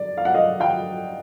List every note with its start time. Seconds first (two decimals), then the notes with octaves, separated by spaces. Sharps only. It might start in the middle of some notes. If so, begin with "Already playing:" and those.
Already playing: D5
0.17 F5
0.25 F#5
0.34 D#5 F5
0.60 F5 G5